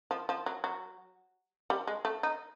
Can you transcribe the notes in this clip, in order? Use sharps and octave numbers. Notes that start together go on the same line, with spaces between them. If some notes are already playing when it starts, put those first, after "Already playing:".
F3
F3
F#3
F#3
G3
G#3
A3
D#4